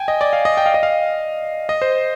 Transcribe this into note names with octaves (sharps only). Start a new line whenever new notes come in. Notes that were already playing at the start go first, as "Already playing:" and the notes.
Already playing: G5 G#5
D#5
D5
F5
D#5
G5
F5
D#5
F5
D#5
C5